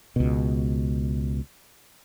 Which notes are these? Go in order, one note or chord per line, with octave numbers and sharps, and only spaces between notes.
C#2 B2